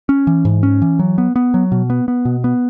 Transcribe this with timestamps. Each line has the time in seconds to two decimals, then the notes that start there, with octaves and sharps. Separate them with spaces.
0.09 C#4
0.27 E3
0.45 G#2
0.63 C#4
0.82 E3
0.99 F#3
1.18 B3
1.36 B3
1.54 F#3
1.72 B2
1.90 B3
2.08 B3
2.25 B2
2.44 B3